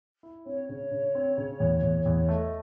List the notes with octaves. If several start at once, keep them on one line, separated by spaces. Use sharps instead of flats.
E4
C4 C#5
C#3 C#5
C#3
C4
C#3
E2
E2
E2
A3 D#5